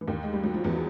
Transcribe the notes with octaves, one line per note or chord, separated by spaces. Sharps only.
E3
D#2 D#3
G#3
G3
F#3
F3
E2 E3